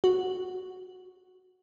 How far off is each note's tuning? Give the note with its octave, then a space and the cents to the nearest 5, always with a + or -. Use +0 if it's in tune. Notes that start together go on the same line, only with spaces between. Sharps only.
F#4 -5